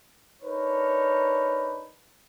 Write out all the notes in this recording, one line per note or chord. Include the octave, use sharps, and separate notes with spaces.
D4 D#4 A#4 B4 C#5